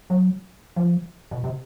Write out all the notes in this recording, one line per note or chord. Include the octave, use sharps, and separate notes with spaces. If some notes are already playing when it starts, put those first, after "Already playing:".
F#3
F3
B2
C3